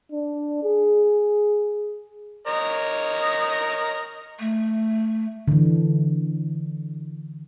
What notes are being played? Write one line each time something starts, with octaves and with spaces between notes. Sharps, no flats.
D4
G#4
A#4 C#5 D#5
A3
D3 E3